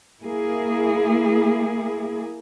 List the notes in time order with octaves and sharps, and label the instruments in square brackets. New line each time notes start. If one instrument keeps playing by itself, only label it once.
[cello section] A#3 E4 G#4